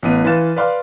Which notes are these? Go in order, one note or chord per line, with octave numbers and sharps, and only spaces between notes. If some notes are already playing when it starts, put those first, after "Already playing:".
A1 B3 D#7
E3 B4 F5 C6 A6 E7
B4 D5 F5 C6